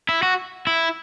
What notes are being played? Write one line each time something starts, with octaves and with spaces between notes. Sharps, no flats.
E4
F#4
E4